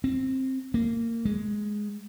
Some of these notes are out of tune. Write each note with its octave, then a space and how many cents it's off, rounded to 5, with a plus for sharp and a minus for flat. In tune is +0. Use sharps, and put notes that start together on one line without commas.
C4 +10
A#3 -20
G#3 +5